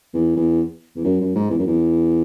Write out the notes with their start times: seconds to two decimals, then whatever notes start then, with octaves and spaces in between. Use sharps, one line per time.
0.14 E2
0.37 E2
0.96 E2
1.05 F#2
1.20 F#2
1.36 G#2
1.50 E2
1.59 F#2
1.67 E2